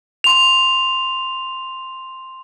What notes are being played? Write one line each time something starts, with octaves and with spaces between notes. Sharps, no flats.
C6 F7